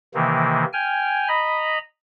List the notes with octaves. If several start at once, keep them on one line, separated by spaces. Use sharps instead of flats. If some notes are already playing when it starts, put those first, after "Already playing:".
C3 D#3 E3 A#3
G5 G#5 F6
D#5 A#5 B5